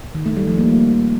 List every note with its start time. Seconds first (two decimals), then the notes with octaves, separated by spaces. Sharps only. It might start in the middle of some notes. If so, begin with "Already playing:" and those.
0.15 D#3
0.26 A3
0.37 G3
0.47 F3
0.58 A#3